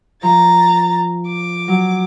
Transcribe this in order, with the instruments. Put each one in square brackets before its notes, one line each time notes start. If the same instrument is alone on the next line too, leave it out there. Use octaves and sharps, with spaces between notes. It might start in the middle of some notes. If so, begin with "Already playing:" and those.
[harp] F3 [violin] A#5 A6
[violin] D6
[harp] F#3